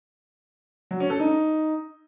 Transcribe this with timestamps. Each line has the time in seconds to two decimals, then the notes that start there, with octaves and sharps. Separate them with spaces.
0.91 F#3
1.00 C#4
1.10 A4
1.20 D#4